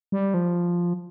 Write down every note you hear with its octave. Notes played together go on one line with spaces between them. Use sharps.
G3
F3